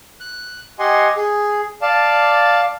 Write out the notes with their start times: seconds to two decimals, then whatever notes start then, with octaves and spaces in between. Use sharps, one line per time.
0.20 F#6
0.79 G4 D#5 F#5 G#5 C6
1.17 G#4
1.82 D5 F5 A5